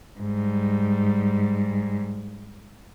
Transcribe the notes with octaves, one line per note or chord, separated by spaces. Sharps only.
G#2 G3